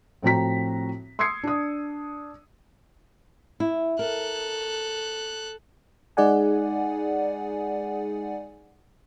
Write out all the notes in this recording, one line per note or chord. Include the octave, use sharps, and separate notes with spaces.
A2 F3 C4 F#4 A#5 B6
C6 D#6 E6 G#6 C7 C#7
D4 D#6
E4
A4 A#4 F#6
G#3 D#4 G#4 D5 F#5 G#5